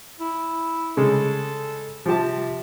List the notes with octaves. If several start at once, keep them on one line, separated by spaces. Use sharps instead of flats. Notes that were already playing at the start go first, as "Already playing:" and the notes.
E4
C#3 G#3 A4
C3 F3 G4 A5